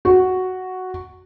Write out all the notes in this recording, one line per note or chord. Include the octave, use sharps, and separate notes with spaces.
F#4